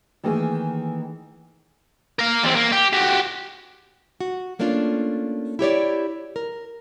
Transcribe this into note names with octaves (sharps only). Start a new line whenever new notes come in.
D#3 E3 A3 A#3 G#4
A#4 F5
E2 C4
A#3
G4
F#4 G4
F#4
A3 A#3 C#4 D4 F4
E4 G4 C#5 D5
A#4